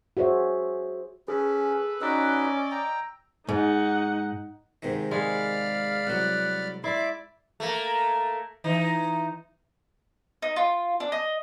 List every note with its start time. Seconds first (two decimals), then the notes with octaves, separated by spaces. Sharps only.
0.17 F#4 G#4 C5 C#5 E5
1.28 C#4 G#4 A4 B4
2.02 C#4 D#4 F#4 B4 D5 D#5 E6
2.71 G5 A#5
3.49 G#2 D#4 F#5
4.82 G#2 C3 D#3
5.11 G#3 D5 F5 B5 F6
6.07 C2 F#3 F#5
6.84 E4 D5 E5 C6 D6
7.60 A3 A#3
8.64 E3 D#4
10.42 D#4
10.56 F4
11.00 D4
11.12 D#5